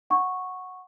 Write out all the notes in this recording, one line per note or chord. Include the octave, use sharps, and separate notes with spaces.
F#5 C#6